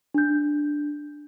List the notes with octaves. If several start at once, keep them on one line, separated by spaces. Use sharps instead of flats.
D4 G6